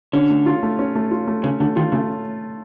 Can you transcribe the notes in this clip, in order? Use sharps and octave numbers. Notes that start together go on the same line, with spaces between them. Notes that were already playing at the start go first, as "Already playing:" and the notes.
D3 C#4
A3
F4
A3
C#4
A3
F4
A3
C#3 C#4
D3 A3
D#3 F4
C#3 A3